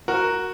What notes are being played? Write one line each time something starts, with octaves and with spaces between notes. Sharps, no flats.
F#4 A#4